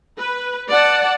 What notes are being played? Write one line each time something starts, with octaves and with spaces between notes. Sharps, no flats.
B4
D5 F#5 A5